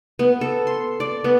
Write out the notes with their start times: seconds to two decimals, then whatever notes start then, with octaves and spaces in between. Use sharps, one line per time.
0.19 B3
0.41 A4
0.67 C6
1.00 D5
1.24 B3